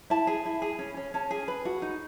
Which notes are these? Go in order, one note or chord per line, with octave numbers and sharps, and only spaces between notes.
E4 A5
G#4
E4
G#4
C#4
C#4
C#4 A5
G#4
B4
F#4
D#4